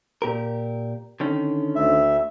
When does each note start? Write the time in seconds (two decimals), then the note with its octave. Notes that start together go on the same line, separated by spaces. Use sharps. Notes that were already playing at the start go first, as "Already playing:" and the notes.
0.22 A#2 G4 A#4
1.20 D3 D#3 C#4
1.76 D2 E5